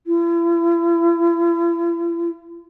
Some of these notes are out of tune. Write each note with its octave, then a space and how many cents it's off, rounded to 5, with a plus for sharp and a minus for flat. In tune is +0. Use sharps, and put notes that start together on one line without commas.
E4 +45